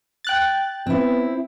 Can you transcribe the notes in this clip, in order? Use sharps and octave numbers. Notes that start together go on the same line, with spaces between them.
G5 F#6 A6
B3 C4 E4